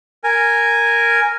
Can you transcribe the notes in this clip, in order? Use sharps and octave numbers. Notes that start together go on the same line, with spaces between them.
A#4 G#5